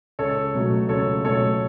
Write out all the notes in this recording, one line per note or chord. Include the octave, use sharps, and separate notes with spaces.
C#2 A4 C#5
B2 F#3 A3
C#2 A4 C#5
B2 F#3 A3 A4 C#5